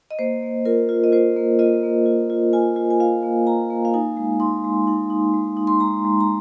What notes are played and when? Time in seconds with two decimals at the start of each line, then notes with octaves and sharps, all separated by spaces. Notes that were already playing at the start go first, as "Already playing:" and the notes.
0.11 D#5
0.19 A#3 C5
0.42 A#3
0.65 F4 A#4
0.89 F4
1.04 D#5
1.12 F4 C5
1.36 A#3
1.59 F4 D#5
1.83 A#3
2.06 F4
2.30 F4
2.53 F4 G#5
2.76 F4
2.91 G#5
3.00 F4 F5
3.23 A#3
3.46 F4 A#5
3.70 A#3
3.85 F5
3.94 D#4 G#5
4.17 G#3
4.40 D#4 C6
4.64 G#3
4.87 D#4
5.10 D#4
5.34 G#3
5.57 D#4
5.67 C6
5.80 G#3 A#5
6.05 G#3
6.20 A#5